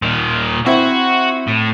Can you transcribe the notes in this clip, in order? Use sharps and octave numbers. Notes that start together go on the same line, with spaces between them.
A#2 D#3
C4 E4 F#4
A2